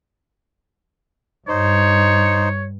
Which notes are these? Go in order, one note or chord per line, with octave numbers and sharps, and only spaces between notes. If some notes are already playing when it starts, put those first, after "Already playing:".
G2 D#4 C5 C#5